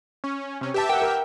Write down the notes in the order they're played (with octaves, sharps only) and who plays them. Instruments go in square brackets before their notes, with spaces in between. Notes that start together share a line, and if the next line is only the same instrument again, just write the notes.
[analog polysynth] C#4
C3 C#4
[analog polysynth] G4 E5 [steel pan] B4 A5
[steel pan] A#4 F#5 [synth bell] G5
[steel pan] A#4